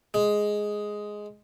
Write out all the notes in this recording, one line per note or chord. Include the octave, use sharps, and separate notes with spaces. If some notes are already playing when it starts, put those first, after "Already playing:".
G#3